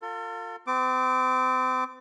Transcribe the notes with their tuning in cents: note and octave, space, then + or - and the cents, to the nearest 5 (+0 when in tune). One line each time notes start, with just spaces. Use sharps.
F4 +20 A4 +45
C4 -35 D6 +0